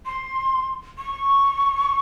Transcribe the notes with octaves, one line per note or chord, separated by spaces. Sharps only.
C6
C#6